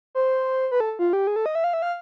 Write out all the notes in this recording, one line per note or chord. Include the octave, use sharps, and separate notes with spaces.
C5
B4
A4
F4
G4
G#4
A4
D#5
E5
F5
E5
F5